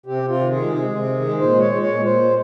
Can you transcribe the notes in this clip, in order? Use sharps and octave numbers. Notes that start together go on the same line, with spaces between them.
C3 G4
C3
F4
D#3
G#4
G#3
C3 G#4
C3
D#3
G#3
A#2 C5
G#3 C#5
G#3
C#5
A#2
A#2 C5
G#3